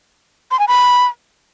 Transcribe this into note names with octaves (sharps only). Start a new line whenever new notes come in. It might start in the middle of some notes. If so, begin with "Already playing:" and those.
C6
G#5
B5